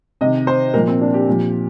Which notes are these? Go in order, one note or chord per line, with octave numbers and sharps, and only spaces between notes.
C3 D#3 D#5
C5
A#2 F3 A#4
C4
D4
G4
A#2 F3